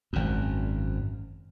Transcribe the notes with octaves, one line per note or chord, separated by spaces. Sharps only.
G#1 F#2